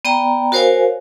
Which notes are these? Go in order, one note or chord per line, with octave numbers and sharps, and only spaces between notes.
B3 D5 G5 A#5
F#4 A#4 C5 C#5 F5 G#5